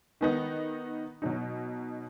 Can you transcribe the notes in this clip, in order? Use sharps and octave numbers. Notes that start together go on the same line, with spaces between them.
D#3 B3 D#4
B2 F#3 D#4